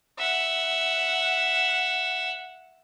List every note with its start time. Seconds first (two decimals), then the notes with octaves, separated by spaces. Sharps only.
0.19 E5 F#5